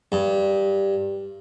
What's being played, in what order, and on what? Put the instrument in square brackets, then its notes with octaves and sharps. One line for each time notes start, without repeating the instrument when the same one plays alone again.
[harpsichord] G2